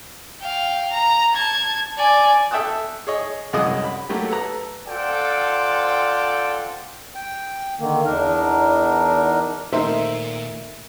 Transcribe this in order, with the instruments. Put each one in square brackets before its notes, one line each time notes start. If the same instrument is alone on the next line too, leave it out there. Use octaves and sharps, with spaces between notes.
[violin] F5 G5
A#5
A5 G#6
D5 G#5
[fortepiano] A4 E5 G5 A5 D#6 F#6
G#4 C#5 D#5
C2 F#2 G#3 F#4 D#5 D#6
B5
F#3 A3 A#3 G4
A4 B4 A#5
[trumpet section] C4 F4 A4 D5 F#5 G5
[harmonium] G5
D3 D#3 A#3
E2 D4 D#4 A#4
[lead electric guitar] A#2 [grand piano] D#3 A3 A#3 [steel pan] D#4 A#4 C5 [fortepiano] E5